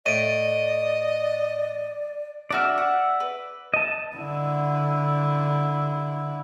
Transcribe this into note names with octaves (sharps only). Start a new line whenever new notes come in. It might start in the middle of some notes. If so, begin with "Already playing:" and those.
A2 D5 D#5 D7 D#7
D4 F#4 D5 E5 F6
F#5
B4
D#5 A5
D3 E4